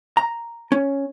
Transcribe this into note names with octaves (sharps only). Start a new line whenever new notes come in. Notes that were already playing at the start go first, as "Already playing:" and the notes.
A#5
C#4